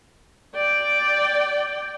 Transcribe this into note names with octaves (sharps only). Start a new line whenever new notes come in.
D5 G5